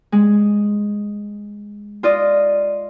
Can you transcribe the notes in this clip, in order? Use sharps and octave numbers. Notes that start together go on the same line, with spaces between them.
G#3
F4 D5 D#5